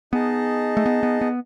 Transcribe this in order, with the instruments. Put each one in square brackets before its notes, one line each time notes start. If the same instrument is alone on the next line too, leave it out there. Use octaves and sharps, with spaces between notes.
[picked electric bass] B3 [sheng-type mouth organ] D#4 G#4 D#5 A5
[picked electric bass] A3
B3
B3
B3